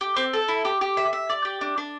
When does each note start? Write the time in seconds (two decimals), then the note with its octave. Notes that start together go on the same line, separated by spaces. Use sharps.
0.01 G4
0.16 C4
0.33 A4
0.48 E4
0.65 G4
0.81 G4
0.97 E5
1.13 E5
1.30 D5
1.45 G4
1.61 D4
1.78 D4